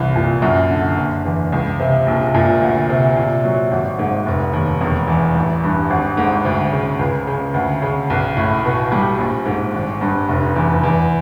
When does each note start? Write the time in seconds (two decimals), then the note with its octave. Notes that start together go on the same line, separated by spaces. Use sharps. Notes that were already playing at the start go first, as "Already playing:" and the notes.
Already playing: C2 E3
0.16 A#2
0.42 F#2
0.70 D3
0.97 F#1
1.25 E2
1.52 C#2
1.80 C3
2.07 A#1
2.34 A#2
2.62 D2
2.89 C3
3.17 A#2
3.44 F#3
3.71 G#1
3.99 G#2
4.26 F1
4.53 D#2
4.81 E1
5.08 E2
5.35 A1
5.63 G2
5.90 G#1
6.17 G#2
6.45 D2
6.72 C#3
6.99 C#2
7.27 C#3
7.54 D2
7.82 C#3
8.10 B1
8.37 A2
8.65 B2
8.92 G3
9.18 A#1
9.46 G#2
9.74 G#1
10.01 G2
10.29 F1
10.56 E2
10.83 E2